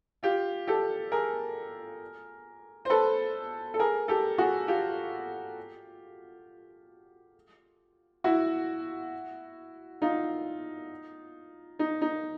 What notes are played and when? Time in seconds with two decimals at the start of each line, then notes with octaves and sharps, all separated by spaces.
0.23 F4 G4
0.67 G4 A4
1.12 G#4 A#4
2.85 C5
2.90 A4 B4
3.74 A4
3.79 G#4 A#4
4.08 G4 A4
4.38 F#4 G#4
4.67 F4 G4
8.24 E4 F#4
10.02 D#4 F4
11.79 D#4
12.01 D#4